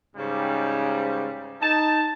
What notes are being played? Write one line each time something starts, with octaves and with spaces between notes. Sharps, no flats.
G#2 C#3 G3
D#4 A5